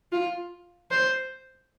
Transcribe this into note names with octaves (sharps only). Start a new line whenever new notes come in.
F4
C5